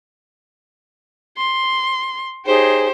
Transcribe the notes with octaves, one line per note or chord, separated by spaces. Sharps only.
C6
D#4 G4 G#4 C5 C#5